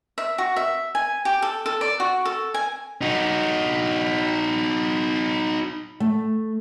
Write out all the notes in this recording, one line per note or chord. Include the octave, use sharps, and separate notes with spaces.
E5
F#4
E5
G#5
G4
A4
A4
D5
F#4
A4
G#5
D#4 F#4
A3